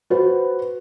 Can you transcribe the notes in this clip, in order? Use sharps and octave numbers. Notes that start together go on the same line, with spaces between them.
F#4 B4 C5